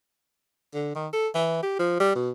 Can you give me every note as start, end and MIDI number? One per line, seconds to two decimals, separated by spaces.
0.74 0.93 50
0.95 1.08 51
1.13 1.28 69
1.34 1.60 52
1.63 1.76 67
1.79 1.95 53
2.00 2.14 55
2.15 2.30 47